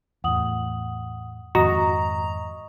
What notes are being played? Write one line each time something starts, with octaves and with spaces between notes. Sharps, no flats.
E2 A2 F#5 D#6 F#7
F2 G#2 D#3 F#4 D#5 A#5 C#6 D#6